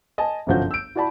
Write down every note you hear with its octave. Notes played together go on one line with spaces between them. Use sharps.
D#5 G#5 A5
G1 C2 F#2 F3 F#4 G6
E6 D7
E4 F#4 D5 A5 B5